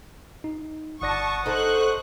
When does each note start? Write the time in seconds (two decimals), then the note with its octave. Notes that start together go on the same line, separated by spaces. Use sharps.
0.44 D#4
1.02 G1 D5 F#5 A5 C#6 D#6 A#6
1.46 D#4 A4 C5 C#6 F#6